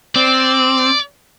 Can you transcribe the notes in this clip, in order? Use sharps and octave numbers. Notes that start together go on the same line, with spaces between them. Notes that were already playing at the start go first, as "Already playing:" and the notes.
C4 D5